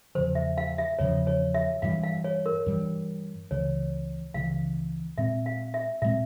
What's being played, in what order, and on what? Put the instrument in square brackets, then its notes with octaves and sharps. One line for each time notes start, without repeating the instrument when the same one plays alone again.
[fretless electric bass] E2 C#3 F3 [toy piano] C5
[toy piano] E5
F5
E5
[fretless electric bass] E2 C#3 F3 [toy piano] C#5
[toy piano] C#5
E5
[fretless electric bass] G2 E3 G3 [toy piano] F5
[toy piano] F5
C#5
A#4
[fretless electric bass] G2 E3 G3
[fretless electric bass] C#2 C#3 E3 [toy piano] C#5
[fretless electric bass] C#2 C#3 E3 [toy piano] F5
[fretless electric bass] A#2 G#3 C4 [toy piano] E5
[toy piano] F5
E5
[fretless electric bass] A#2 G#3 C4 [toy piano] E5